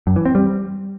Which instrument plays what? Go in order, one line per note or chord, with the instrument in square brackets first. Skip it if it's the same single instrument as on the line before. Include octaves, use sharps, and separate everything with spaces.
[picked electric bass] F#2
E3
C4
G3